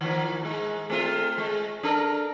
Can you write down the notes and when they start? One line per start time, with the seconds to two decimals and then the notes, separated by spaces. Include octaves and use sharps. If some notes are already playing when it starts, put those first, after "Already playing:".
0.01 D#3 F3 A#3
0.43 G#2 G#3
0.90 A3 C4 F4
1.38 G#3
1.83 D4 A4 A#4